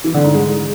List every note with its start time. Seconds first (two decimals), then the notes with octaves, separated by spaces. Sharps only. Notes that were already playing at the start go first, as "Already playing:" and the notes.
0.04 E3
0.14 D3
0.24 G#2
0.34 G#3